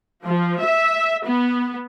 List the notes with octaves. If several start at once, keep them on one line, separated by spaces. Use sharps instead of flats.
F3
E5
B3